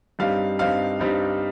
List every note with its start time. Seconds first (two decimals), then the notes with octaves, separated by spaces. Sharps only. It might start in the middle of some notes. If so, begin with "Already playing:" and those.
0.19 G2 G3 C4 D#4 F5
0.59 G2 G3 C4 D#4 F5
1.00 G2 G3 C4 D#4